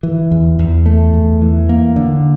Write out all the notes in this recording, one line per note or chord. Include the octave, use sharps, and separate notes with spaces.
E3
E2
E2
A3
E2
E3
A#3
D3